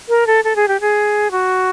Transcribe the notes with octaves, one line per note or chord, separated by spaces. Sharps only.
A#4
A4
A4
G#4
G4
G#4
F#4